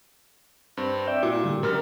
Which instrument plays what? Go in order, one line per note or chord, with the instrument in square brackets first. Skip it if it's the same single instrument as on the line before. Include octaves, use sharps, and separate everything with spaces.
[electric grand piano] G2 C4
[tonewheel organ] D5 E5 G5
[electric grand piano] A#2 [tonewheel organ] E4 F#4
[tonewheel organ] A2 D3 G3
[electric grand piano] F#2 G3 F6 [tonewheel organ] A#4